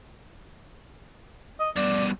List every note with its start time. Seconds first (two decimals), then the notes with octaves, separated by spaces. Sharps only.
1.60 D#5
1.77 G2 B2 D5